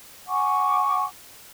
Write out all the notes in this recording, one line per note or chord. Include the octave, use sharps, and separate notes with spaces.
F#5 G#5 C#6 D6